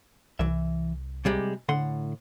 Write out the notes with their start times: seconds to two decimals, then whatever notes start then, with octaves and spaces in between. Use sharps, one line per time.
0.39 C2 E3 E5
1.25 C3 G3 G#3
1.69 A2 D3 F#5 C6